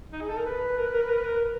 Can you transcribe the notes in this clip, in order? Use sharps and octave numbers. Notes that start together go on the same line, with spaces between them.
D#4
G#4
A4
A#4
B4
A#4
B4
A#4
B4
A#4
B4
A#4